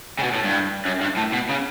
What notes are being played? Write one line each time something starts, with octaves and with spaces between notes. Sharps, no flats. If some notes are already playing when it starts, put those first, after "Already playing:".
C#3
B2
A2
G2
F#2
G2
A2
B2
C#3